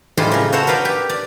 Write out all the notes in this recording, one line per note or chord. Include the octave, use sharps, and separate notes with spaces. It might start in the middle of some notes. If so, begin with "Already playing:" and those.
F2 A2 G3 G#3 F4 C6
C#3 A#4
F#4 A4 C5 C#5 F#5
A#4 B4 D5 F5 G5
G4
D5